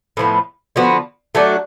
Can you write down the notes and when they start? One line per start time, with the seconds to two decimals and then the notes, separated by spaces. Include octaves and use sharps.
0.17 A2 F3 B3
0.76 D3 F3 B3 F#4
1.35 F#3 A3 D4 F#4